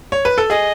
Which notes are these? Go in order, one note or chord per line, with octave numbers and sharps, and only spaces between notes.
C#5
B4
A4
G#4 D#5